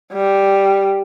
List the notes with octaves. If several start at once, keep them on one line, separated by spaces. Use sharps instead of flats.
G3